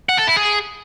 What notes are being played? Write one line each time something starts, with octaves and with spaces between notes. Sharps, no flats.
F#5
A4
E4
G#4